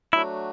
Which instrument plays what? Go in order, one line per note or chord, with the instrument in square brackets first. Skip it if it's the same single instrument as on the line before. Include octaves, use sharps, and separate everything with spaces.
[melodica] F#3 A3 D4 F#4 [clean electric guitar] E4